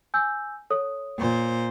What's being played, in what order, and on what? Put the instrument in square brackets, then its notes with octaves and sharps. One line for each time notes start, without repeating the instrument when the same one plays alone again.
[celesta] G#5 E6 G6
A4 C#5 D#6
[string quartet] A#2 C5